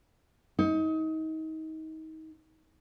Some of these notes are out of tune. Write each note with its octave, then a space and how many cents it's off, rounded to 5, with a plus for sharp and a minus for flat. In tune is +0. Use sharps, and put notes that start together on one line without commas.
D#4 +30